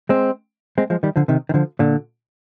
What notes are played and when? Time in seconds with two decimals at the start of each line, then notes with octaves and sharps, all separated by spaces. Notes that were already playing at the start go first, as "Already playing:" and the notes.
0.09 G#3 C4
0.78 G#3 C4
0.90 F3 G#3
1.03 D#3 G3
1.16 D3 F3
1.28 C3 D#3
1.49 D#3
1.54 D3 F3
1.79 A#2 D3